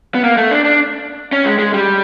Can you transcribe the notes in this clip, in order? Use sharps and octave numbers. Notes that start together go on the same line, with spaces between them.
B3
A#3
A3
D4
D4
C#4
G#3
G#3
G3